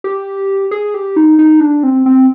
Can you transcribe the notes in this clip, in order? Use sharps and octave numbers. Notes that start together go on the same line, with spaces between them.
G4
G#4
G4
D#4
D#4
D4
C4
C4